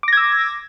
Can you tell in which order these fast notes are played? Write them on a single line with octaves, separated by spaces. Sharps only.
D6 A#6 G#6 E6